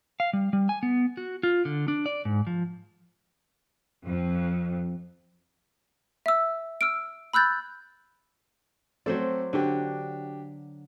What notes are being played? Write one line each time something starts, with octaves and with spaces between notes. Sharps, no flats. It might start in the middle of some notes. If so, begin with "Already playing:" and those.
F5
G3
G3
G#5
B3
F#4
F4
D3
D4
D5
G#2
F3
F2
E5 E6
E6 F6 D7
B5 E6 F#6 G6 A6
F#3 A3 C4 A4 C5 D5
D3 D4 F#4 G4